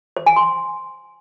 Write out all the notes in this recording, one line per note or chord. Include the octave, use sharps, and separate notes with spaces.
C5
G#5
C6